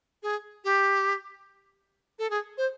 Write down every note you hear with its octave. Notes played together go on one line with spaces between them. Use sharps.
G#4
G4
A4
G#4
C5